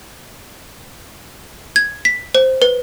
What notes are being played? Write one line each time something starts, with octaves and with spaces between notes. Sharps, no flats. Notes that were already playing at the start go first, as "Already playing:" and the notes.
G#6
B6
C5
B4